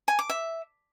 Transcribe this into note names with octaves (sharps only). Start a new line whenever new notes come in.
G#5
D6
E5